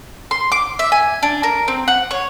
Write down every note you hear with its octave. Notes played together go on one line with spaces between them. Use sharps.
C6
D6
E5
G#5
D4
A#4
C4
F#5
C#5